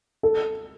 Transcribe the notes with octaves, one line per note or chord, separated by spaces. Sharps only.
A4